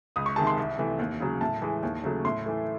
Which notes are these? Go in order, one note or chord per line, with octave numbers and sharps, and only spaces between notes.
C#2 D#6
C#6
C3 D#3 G#3 A5
C6
C2
C3 E3 A3
D#2
C#3 F#3
A2 A5
E3 G#3
D#2
C#3 F#3 A3
A2 C6
E3 A3